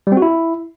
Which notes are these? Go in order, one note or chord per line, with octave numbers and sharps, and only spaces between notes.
G3
C4
F#4
E4